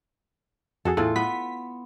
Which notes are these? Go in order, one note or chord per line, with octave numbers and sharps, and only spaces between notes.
F2 F#4 G#4 A4
E2 A2 F4 G#4 A4
B3 B6